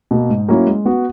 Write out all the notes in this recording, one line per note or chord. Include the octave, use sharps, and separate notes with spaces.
B2 A#3
G#2
F#3 A#3 C#4 E4
G#3
B3 F#4